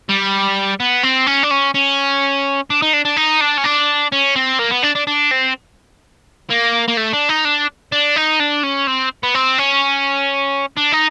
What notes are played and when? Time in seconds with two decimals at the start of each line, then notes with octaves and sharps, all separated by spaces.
0.09 G3
0.80 B3
1.04 C4
1.27 C#4
1.43 D4
1.51 C#4
1.74 C#4
2.70 D4
2.82 D#4
2.93 D4
3.05 D4
3.17 D#4
3.41 D4
3.58 C#4
3.65 D4
4.12 C#4
4.36 C4
4.60 A#3
4.72 B3
4.83 D4
4.96 D4
5.07 D4
5.31 C4
6.50 A#3
6.88 A#3
6.97 A3
7.13 D4
7.29 D#4
7.45 D4
7.92 D4
8.16 D#4
8.40 D4
8.63 C#4
8.87 C4
9.23 B3
9.35 C4
9.58 C#4
10.77 D4
10.93 D#4